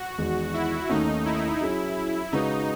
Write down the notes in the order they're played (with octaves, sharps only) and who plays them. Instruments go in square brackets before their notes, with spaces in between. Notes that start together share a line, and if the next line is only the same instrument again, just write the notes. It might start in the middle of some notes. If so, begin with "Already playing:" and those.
Already playing: [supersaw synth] F#4
[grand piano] E2 D#3 G#3
[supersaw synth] E4
[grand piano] D#2 D#3 A3 C#4 [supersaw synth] D#4
[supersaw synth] E4
[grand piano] F#3 C#4 G#4 C#5
[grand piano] C#3 G#3 C#4 F#4 B4 [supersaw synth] D#4